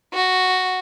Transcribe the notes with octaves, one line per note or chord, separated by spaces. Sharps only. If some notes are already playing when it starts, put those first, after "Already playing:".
F#4